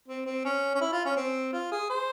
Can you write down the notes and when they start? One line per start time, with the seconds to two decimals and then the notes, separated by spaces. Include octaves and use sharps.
0.08 C4
0.26 C4
0.45 C#4
0.75 C#4
0.81 E4
0.92 F4
1.05 C#4
1.17 C4
1.53 F4
1.72 G#4
1.90 C5